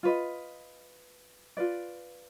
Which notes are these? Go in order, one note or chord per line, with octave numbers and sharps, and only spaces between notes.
F4 B4 D#5
F4 B4 D5